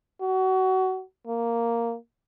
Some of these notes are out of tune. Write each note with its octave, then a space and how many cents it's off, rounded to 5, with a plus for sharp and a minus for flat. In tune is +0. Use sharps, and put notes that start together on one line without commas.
F#4 +25
A#3 -5